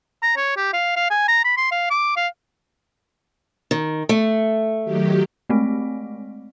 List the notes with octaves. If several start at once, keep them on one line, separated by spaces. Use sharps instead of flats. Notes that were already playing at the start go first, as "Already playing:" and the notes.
A#5
C#5
G4
F5
F5
G#5
A#5
B5
C6
F5
D6
F5
D#3
A3
D#3 F#3 G4
G#3 A3 C4